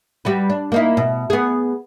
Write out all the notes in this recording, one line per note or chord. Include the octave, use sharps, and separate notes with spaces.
G3 F#4 B4
D4
A#3 D#4 E4
B2
B3 G#4